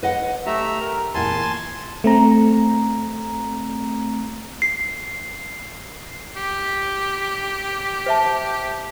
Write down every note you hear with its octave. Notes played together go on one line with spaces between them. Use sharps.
B4 D#5 F#5
A3 G4 E5 A#5
A#4
E2 A#2 G#5 A5 C6
A3 C4 A#5
C7
G4
C5 E5 A5